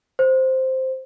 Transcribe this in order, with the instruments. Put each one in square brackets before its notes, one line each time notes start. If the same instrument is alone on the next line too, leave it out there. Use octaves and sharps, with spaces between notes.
[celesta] C5